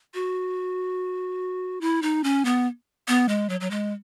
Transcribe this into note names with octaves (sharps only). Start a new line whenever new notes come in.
F#4
E4
D#4
C#4
B3
B3
G#3
F#3
F#3
G#3